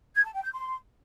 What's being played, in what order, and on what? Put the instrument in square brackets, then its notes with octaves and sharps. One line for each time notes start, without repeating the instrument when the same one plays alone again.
[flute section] G#6
A5
G5
G6
C6